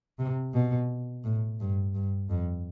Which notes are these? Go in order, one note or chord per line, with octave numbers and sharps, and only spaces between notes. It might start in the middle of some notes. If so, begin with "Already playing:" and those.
C3
B2
A2
G2
G2
F2